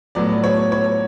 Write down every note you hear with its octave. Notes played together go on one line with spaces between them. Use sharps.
A2 F#3 B3 D5
C#5
C#5